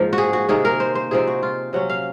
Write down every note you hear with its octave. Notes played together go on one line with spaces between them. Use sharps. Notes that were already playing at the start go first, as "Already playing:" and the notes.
Already playing: G#2 F3 A#3
F#4
G#4
F#4
C3 D#3 A#3 G#4
A#4
C5
C5
C3 F3 C4 D#4 G#4
F#4
F4
C3 F#3 C#4 F#5
F5